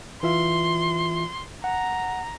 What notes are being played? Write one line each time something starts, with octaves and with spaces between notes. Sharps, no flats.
E3 F4 E5 C6
F#5 A#5